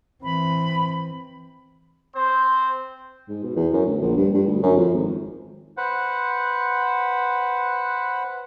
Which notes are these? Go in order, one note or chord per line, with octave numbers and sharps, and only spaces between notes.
E3 C4 B5
C4 C5
G#2
B2
E2
F#2
D2
A#1
G2
G2
D2
F#2
F2
G#1
B4 C5 F#5